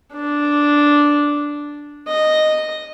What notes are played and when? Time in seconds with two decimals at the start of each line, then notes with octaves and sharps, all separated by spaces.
0.13 D4
2.08 D#5